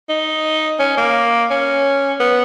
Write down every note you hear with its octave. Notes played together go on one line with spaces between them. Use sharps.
D#4
C#4
A#3
C#4
B3